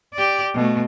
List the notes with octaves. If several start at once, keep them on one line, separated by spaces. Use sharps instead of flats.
G4 D5
B2 A3